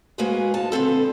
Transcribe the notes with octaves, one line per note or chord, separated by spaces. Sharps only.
G#3 A#3 F#4 G#4 B4 C5
D#4 A5
D3 B3 C4 A4